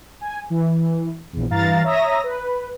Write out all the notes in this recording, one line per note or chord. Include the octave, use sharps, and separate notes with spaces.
G#5
E3
A#1 E2
G2 E3 F5 A#5 A6
C#5 E5 A#5 D#6 A#6
B4